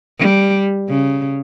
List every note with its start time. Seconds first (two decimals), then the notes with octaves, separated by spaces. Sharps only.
0.19 G3
0.89 C#3